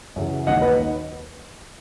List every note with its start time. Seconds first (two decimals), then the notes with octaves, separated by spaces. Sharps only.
0.16 F#2 C#3 E3
0.47 D#2 D#3 F#3 D#5 F#5
0.62 B4 D#5